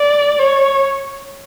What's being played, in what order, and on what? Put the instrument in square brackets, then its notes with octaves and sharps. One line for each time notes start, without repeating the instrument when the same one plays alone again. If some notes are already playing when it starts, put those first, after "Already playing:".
Already playing: [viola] D5
C#5